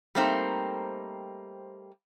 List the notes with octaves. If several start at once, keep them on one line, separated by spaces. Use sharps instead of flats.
G3 A3 A#3 C4 D#4 C5